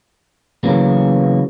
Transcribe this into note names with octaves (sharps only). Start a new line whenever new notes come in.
C#3 E3 F#3 A#3 B3